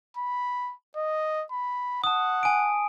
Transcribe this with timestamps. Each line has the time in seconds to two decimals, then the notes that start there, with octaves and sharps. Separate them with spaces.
0.17 B5
0.97 D#5
1.52 B5
2.04 F#5 A5 D#6
2.43 G#5 D7